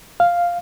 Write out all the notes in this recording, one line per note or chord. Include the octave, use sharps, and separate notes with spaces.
F5